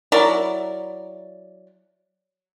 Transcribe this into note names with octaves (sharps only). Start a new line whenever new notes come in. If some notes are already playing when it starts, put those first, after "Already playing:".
F#3 E4 A#4 D5